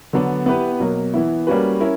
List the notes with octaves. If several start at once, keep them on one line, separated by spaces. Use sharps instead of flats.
D3 F#3 B3 D4
B3 E4 G4 B4
B2 F#3 A#3
E3 B3 E4
G3 A#3 C#4 F#4 B4
C#4 E4 A#4